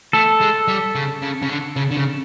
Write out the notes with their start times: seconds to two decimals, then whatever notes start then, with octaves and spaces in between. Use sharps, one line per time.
0.13 A3 A4
0.41 G#3
0.68 G3
0.95 C#3
1.22 C#3
1.42 C#3
1.49 D3
1.76 C#3
1.91 D3
1.97 C#3